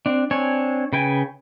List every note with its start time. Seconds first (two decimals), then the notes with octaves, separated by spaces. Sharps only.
0.06 C4 D4
0.31 C4 D4 C#5 G#5
0.93 C#3 B4 G5 G#5